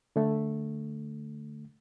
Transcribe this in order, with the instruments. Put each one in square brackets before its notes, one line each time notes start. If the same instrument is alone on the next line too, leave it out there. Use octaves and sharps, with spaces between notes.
[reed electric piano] D3 A3